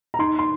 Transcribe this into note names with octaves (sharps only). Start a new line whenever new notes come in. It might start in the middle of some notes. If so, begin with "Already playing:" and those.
A#5
D#4 C6
C6